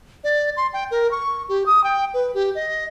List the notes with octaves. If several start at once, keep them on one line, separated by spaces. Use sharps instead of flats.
D5
C6
G5
A#4
C#6
G4
D#6
G5
B4
G4
D#5